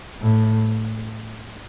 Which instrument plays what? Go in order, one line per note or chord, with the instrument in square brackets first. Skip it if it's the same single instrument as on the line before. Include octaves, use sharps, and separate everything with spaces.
[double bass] A2